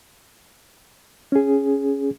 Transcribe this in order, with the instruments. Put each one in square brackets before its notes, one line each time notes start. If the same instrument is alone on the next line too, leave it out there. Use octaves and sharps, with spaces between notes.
[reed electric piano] C#4 G#4